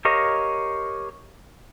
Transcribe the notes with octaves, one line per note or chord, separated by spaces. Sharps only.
G4 A#4 C#5 D#5 F5